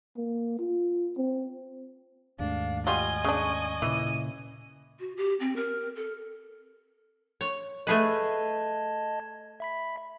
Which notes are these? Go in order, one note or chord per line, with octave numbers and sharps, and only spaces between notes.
A#3
F4
C4
D#2 G#2 A3 D4 F5
G3 F4 F#4 D#5 G#5 G7
C#3 D4 C#6
A#2 C#3 E3 D#7
F#4
G4
C4
A#4
A4
C#5
A3 G#4 B4 D#5 A5 G#6
E5 B5 B6